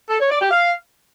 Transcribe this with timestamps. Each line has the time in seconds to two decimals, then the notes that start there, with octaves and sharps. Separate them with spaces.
0.10 A4
0.20 C#5
0.30 D5
0.41 G4
0.51 F5